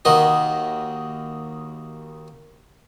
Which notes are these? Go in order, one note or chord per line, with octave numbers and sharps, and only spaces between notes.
D#2 D#3 F#4 D#5